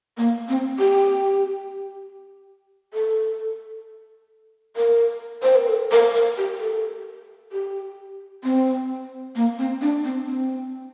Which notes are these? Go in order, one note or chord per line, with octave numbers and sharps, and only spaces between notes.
A#3
C4
G4
A4
A#4
C5
A#4
A4
A#4
A#4
G4
A4
G4
C4
A#3
C4
D4
C4
C4